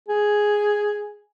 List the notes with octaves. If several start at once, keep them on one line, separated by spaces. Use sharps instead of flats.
G#4